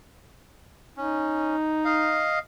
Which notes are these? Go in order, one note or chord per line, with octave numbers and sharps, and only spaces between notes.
C#4 D#4
D#5 F5